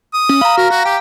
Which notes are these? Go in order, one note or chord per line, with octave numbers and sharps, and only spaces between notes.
D#6
C#4
F5 A#5 B5
F#4 A#4
F#4 A#6
G4 G5